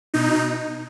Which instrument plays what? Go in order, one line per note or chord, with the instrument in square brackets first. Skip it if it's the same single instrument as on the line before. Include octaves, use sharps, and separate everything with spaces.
[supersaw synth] B2 D#4